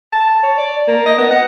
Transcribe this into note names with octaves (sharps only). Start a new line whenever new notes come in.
A5
C#5
D5
A#3
D#5
B3
F#5